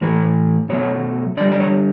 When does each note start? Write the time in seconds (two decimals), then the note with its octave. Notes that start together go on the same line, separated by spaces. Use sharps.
0.01 A2 E3 A3 B4
0.69 B2 F#3 A3 C#5
1.37 D3 D5
1.41 G3
1.52 D5
1.60 C#5